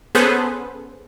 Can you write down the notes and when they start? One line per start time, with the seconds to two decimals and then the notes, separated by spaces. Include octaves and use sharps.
0.15 B3 C#4 G#4 A4 B4 C5